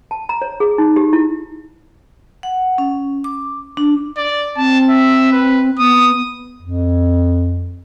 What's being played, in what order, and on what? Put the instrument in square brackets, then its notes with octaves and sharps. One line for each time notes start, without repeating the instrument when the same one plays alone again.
[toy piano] A5
A#5
C#5
G#4
D#4
G4
E4
[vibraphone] F#5
C#4
D6
D4
[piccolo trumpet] D5
[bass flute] C4 [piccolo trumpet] A5
[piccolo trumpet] E5
B4
[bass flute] B3 [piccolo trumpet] D#6
[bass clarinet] F2